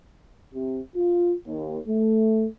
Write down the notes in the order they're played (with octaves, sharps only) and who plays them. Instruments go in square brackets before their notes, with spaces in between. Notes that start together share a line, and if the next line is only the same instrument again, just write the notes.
[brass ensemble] C3
F4
D#2
A3